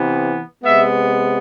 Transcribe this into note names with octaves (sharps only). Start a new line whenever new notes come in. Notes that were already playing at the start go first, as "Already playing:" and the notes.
Already playing: C3 E3 B3
C3 G#3 B3 E5